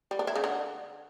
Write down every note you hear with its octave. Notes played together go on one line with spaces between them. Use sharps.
G3
D4
E4
C#3
D3